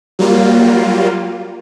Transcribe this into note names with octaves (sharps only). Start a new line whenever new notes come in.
F#3 G3 A#3 F4